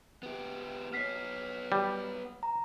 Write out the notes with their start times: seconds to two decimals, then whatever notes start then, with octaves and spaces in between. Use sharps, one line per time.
0.23 B3 G4
0.93 B3 C#5 F6 B6 C7
1.72 G3
2.43 A#5